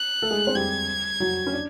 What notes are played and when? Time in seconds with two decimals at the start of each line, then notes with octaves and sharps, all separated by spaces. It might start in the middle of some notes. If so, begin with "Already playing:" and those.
Already playing: F#6
0.22 A3 A4
0.31 G#3 G#4
0.47 C4 C5
0.55 G3 G4 G#6
1.20 F#3 F#4
1.47 C#4
1.53 D4